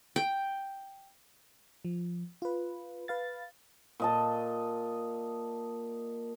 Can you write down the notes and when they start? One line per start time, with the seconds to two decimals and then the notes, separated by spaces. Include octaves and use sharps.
0.16 G5
1.85 F3
2.42 F4 B4
3.08 B4 F5 A6
4.00 A#2 D#5 A5